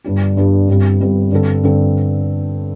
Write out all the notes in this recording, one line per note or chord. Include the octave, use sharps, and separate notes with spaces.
G1 G2 G3 D4 G4
G1 G2 G3 D4 G4
G1 G2 G3 C4
G1 G2 G3 C4
G2 D3 C4 A4
G2 D3 C4 A4